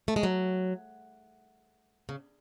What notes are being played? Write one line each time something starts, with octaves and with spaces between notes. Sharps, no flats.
A3
G#3
F#3
C#3